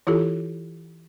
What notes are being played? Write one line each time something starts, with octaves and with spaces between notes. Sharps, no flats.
E3 E4 F4 G4 A4